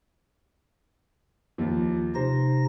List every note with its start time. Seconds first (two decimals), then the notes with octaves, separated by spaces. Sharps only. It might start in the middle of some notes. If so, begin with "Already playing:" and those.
1.58 D#2 F3
2.15 C3 D#4 C5 A#6